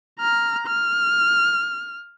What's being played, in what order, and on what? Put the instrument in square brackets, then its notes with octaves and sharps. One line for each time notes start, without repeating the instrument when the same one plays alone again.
[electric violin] A#5 F6
F6